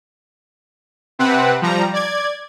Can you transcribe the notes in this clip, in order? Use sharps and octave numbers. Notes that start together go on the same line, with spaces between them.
C3 C4 B4 F#5
F3 G3 A#5
D5 G#6